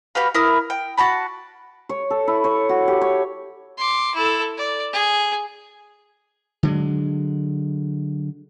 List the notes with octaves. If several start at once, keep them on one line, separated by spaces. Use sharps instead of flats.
F#4 G4 B4 F5
E4 A#4 D#6
G5
F#4 F#5 A5 B5
C#5
A4
E4
C#5
F#4
G4
C#5
C6 D6
E4 A4
D5
G#4
D3 F#3 G#3